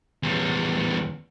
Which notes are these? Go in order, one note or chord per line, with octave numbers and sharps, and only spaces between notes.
E2 G3